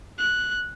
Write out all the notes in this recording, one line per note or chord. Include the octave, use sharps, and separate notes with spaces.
F#6